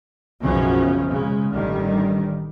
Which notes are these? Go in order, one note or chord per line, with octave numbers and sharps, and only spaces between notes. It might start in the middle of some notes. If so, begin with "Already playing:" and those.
B1 F#2 C#3 F3 C#4
C#3 G#3
A1 G2 D#3 G3